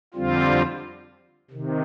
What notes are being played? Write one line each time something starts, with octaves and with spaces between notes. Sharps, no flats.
F2 D3 G3 C4 F4
C3 D#3